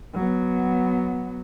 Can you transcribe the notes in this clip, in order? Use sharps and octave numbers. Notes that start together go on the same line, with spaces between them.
F#3 B3